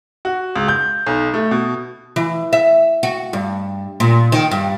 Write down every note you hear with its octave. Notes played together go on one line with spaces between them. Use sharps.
F#4
C#2
G6
B1
A3
B2
E3
E5
F#4
G2
A#2
D#3
G2